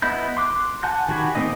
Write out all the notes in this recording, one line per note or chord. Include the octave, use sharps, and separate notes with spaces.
B3 E4 D#5 B5 G6
C6 D6 F#6
F#5 G#5 A5 F#6 G6
D#3 F#4 G4 G#5 B5
A3 A#3 C4 D#4 D#5